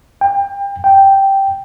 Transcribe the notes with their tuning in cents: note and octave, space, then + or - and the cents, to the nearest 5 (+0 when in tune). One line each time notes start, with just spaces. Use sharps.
G5 +30
G5 -5